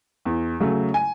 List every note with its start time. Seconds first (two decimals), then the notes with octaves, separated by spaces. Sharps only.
0.25 E2
0.60 C#3 F#3 A3
0.94 G#5